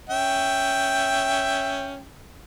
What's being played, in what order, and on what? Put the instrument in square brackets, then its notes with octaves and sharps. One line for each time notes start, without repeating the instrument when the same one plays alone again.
[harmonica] C#4 E5 G5